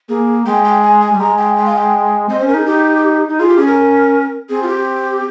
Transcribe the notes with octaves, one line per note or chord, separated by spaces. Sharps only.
A#3 G#4
G#3 G5
G5
G#5
G#5
G3
G#3 A#5
G5
G5
F5
G5
C4 D#5
C5
C#4
A#4
D#4 G#4
D#4 G4
D#4
F4 G#4
G4
C#4 G#4
A#4
C4 G#4
F4
G4